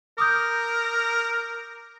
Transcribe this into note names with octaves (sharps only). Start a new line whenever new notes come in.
A#4 D6 D#6 G6